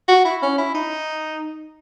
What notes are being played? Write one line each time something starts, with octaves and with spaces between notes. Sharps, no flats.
F#4
E4
C#4
E4
D#4